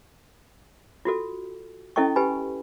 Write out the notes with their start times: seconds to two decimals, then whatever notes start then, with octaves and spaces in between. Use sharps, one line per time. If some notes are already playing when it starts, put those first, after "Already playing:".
1.05 F4 F#4 A4
1.96 C#4 E4 A4 D#5 G5 C#6
2.16 G4 B4 G#5 B5